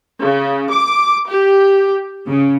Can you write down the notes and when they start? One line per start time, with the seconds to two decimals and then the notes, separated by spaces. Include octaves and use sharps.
0.22 C#3
0.70 D6
1.29 G4
2.27 C#3